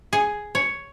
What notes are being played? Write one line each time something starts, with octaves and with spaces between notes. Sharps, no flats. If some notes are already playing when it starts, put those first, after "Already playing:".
G#4
C#5